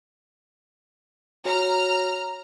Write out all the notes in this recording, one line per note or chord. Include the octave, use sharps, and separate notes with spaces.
F#4 C#5 A#5 F6